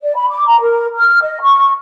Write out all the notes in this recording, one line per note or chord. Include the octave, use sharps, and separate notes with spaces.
D5
B5
D6
A#5
A#4
F6
D#5
C#6